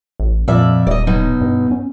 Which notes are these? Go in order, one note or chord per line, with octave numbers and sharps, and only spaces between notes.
A1
F2 A#2 D5 E5
D#1 D5 D#5
B2 F#3 D#4
G2
C#4